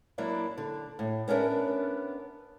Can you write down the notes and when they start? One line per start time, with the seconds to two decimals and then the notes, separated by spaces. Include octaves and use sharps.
0.18 F#3 A#3 D4 E4
0.58 D3
0.99 A2
1.28 B3 C#4 D4 A#4 E5